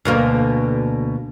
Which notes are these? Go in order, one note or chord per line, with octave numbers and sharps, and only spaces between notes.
D2 B2 A#3